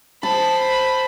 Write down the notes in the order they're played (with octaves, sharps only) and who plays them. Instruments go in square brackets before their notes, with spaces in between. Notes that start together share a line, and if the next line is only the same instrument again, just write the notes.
[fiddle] C5 B5 [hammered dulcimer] A5